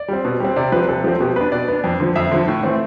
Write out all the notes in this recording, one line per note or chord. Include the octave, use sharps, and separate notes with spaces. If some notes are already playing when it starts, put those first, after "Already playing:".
Already playing: D5
G3 C4
B2
G3 C4
C3 D5
F3 C4 B4
C3 A4
F3 C4 G4
B2 G4
B3 D4 B4
B2 D5
B3 D4
F2
D3 F3
F2 E5
D3 F3
A2
E3 A3 C4